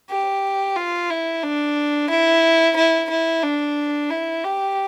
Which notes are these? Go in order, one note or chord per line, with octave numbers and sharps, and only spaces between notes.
G4
F4
E4
D4
E4
E4
E4
D4
E4
G4